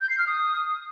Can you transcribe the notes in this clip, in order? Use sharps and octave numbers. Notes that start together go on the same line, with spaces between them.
G6
C7
F6
D#6